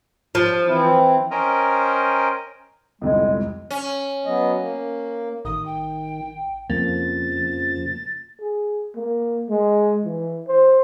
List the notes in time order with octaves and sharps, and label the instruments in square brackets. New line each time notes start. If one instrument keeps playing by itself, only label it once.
[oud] F3
[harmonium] E3 C4 E4
[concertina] C#4 A#4 C5 D#5 G5 A#5
[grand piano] G1 C2 F2 [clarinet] G#3
[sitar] C#4
[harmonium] F#3 B3 D#5
A#3
[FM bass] A1 [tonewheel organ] D#3 [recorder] D#6
[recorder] G5
[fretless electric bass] F2 [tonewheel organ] C#3 F3 [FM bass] A#3 [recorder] A6
[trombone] G#4
A#3
G#3
E3
C5